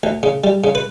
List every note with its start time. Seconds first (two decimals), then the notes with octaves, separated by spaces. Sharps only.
0.03 D2
0.23 C#3
0.44 G3
0.64 C#3
0.75 B4